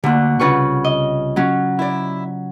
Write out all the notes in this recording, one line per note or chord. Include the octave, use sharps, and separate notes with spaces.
D2 D3 A#3 F#6
C2 C#3 F4 B4 F#5 C#6
D#5
F#3 C#4 F#4
E4 D5